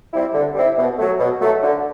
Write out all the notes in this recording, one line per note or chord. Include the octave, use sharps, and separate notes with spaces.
G3 C4 E4
D3
G3 C4 E4
B2
F#3 A3
B2
F#3 A3
D3